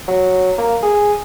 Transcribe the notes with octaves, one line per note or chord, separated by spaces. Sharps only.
F#3
A#3
G#4